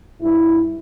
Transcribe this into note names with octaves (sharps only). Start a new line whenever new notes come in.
G2 E4